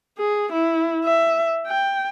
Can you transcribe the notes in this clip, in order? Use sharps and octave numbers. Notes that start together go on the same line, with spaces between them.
G#4
E4
E5
G5